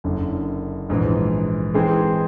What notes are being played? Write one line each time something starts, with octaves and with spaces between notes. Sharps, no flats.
F#1 F#2 D3
A#1 G#2 E3
E3 G#3 C4 D#4 G#4